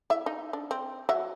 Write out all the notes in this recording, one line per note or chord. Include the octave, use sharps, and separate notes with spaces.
E4 E5
D#4
D4
C4
F#3 E5